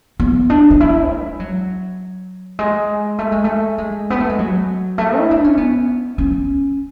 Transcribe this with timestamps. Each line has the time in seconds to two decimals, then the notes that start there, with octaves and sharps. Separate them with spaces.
0.20 B3
0.50 D4
0.70 D4
0.80 E4
1.10 G#3
1.40 F#3
2.59 G#3
3.19 A3
3.32 G#3
3.44 A3
3.78 G#3
4.10 B3
4.20 A3
4.29 G#3
4.39 F#3
4.98 A3
5.18 E4
5.31 D4
5.44 C#4
5.57 B3
6.18 C#4